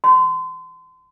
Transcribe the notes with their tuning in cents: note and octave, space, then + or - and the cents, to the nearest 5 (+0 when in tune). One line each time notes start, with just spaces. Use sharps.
C6 -35